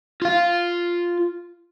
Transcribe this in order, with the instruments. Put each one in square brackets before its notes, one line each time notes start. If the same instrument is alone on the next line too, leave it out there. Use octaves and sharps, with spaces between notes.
[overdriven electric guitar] F4 F5